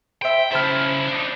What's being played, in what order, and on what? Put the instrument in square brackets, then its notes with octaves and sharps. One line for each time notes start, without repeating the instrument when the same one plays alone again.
[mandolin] C5 E5 [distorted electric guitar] G5
[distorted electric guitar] C#3 E4 [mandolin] C5 A5 F6
[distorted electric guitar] D4 D#4